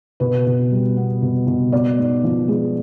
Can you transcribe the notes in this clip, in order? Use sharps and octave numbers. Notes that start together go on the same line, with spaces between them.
B2 B4
B2
G3
B3
B2
B2
B3 D5
G#2
F3
G#3